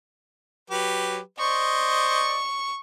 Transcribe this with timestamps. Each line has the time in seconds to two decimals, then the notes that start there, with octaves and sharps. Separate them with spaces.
0.70 F#3 G4 B4
1.39 C5 D5 D#5 C#6